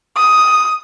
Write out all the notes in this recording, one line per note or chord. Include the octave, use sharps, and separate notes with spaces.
D#6